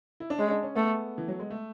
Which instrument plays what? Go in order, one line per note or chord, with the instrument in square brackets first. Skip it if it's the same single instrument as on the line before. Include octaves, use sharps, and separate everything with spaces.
[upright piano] E4
D4
[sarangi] G#3 [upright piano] C#4
[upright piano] D4
C#4
[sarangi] A3 [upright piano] B3
[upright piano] E3
F#3
G#3
A3